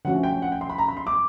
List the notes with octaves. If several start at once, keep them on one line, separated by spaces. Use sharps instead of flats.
D3 F3 A3 C#4 F#4 F#5
G5
F#5
G5
C6
B5
A#5
B5
C6
D6